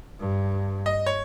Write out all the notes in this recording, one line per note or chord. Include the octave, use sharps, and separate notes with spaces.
G2
D#5
C#5